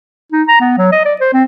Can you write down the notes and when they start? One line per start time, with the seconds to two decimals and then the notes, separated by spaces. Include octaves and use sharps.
0.32 D#4
0.48 A#5
0.60 B3
0.78 F#3
0.92 D#5
1.05 D5
1.20 C5
1.33 C4